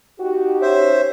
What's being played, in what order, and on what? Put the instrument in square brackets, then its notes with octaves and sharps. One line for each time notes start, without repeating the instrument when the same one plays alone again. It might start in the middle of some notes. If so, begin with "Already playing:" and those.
[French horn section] D#4 G4 [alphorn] F#4
[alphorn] C#4 [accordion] C5 E5